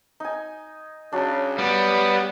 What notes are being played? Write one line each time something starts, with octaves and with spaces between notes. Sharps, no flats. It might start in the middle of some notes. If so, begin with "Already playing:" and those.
D#4 G#5
C#3 F#3 D4
G3 B3